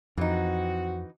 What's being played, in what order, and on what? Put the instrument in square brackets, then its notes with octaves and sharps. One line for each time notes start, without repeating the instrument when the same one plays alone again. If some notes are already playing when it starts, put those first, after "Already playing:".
[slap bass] F2 [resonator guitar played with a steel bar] E3 D#4 [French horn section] C4 F#4